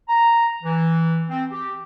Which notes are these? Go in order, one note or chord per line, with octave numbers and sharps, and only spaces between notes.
A#5
E3
C4
G4